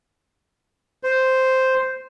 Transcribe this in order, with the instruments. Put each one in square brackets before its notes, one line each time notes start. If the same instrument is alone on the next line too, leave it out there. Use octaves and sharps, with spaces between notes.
[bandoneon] C5